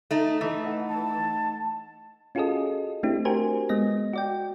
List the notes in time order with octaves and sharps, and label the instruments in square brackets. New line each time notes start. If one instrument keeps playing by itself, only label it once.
[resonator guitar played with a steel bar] A3 D#4
[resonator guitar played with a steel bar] E3 [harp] A3 D#4
[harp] D#5 F#5
[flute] A5
[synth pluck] C#4 F4 F#4 G#4 A4 D#5
A3 C4 D4 E4 G4
F#4 G4 A#4 C5 G#5
G#3 B3 D#5 A#6
F#4 D5 G5